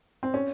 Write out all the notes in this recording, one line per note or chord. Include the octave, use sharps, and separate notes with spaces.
C4
C#4